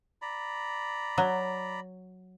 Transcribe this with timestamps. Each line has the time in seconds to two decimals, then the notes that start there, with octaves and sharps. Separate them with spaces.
0.22 D5 A#5 B5
1.18 F#3